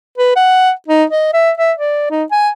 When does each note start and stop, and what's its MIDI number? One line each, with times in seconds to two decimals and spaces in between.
0.18 0.36 71
0.36 0.71 78
0.88 1.04 63
1.10 1.30 75
1.33 1.51 76
1.58 1.72 76
1.78 2.10 74
2.11 2.24 63
2.31 2.50 80